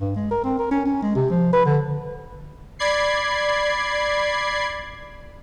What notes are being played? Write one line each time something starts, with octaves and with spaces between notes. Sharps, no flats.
G2
G#3
A#4
C4
A#4
C#4
C#4
G#3
C3
F3
B4
D3
D5 B5 G#6 C7